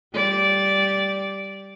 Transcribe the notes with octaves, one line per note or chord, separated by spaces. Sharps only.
G3 D5